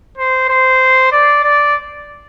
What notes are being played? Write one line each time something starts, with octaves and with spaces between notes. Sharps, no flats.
C5
C5
D5
D5